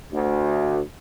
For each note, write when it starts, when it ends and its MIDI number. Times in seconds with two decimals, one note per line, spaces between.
0.12 0.79 38